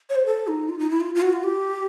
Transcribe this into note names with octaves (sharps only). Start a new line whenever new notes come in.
C#5
C5
A4
D#4
F4
D#4
E4
F4
F4
F#4
F4
G4